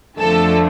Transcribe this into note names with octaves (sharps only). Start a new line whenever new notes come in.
F2 D3 F3 A3 A4